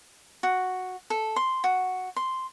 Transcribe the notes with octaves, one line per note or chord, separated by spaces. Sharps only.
F#4
A4
C6
F#4
C6